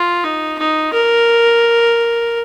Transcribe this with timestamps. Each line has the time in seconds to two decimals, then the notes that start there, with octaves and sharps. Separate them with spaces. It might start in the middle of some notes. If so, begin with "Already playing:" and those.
Already playing: F4
0.24 D#4
0.58 D#4
0.93 A#4